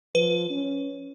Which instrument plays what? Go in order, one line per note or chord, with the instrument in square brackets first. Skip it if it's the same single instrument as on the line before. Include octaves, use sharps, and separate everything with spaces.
[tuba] F3 [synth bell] B4
[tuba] C#4